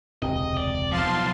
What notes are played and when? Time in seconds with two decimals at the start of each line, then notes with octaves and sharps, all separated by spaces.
0.22 E1 C#2 C3 D#5
0.57 D5
0.92 B1 F3 F5 A5 C6